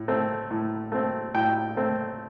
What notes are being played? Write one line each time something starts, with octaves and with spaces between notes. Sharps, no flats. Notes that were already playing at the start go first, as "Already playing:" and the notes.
Already playing: A2
A3 C4
A2
A3 C4
A2 G5
A3 C4